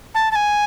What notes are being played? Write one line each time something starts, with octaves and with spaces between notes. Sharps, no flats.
A5
A5
G#5